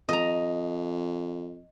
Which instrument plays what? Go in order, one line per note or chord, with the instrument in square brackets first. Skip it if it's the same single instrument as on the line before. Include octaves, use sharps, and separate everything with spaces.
[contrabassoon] F2 [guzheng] D#5 A#5